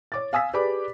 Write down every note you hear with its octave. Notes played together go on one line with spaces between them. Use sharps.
C#5 D6 A6
F5 G#5 D#6 E6 B6
G4 G#4 B4 D5 B5 D6